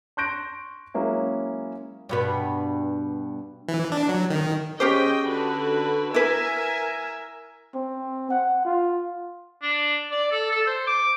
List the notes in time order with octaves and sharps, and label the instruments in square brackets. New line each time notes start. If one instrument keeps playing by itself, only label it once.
[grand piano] C6 C#6 F#6 G6 A#6 D7
F#3 G#3 A#3 C#4 E4
[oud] G2 B2 B4
[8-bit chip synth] E3
D4
F#3
D#3
[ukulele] C#4 G4 C5 [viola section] G#4 D#5 G5
[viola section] D3 F#4 B4
[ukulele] E4 B4 [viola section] A#4 E5 G#5
[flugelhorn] C4
F#5
F4
[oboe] D4
D5
A4
A4
C5
D6